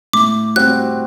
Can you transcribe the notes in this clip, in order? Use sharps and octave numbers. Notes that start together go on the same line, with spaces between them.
A2 D6
G3 C4 F#4 F#6